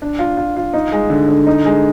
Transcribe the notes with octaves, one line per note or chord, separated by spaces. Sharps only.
D4
F4
F4
F4
D#4
G#3
D3
D3
D#4
G#3